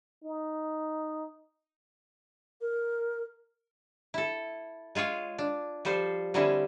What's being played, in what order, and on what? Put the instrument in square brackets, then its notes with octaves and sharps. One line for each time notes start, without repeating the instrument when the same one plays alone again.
[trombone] D#4
[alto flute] A#4
[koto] E4 A4
G#3 F4 G#4 C#5 F5
D4
F3 G3 A4 C5
D3 G3 C4 C#4 E4